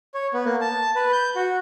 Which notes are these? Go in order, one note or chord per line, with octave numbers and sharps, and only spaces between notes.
C#5
B3
A#3
A5
B4
G6
F#4